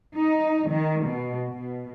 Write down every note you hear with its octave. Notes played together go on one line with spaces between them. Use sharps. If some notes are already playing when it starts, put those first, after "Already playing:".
D#4
D#3
B2
B2